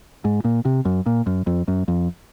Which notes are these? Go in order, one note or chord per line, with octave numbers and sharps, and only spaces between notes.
G#2
A#2
C3
F#2
A#2
F#2
F2
F#2
F2